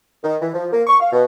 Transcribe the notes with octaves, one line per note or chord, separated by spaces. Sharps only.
D#3
E3
F3
A#3
C#6
F5
B2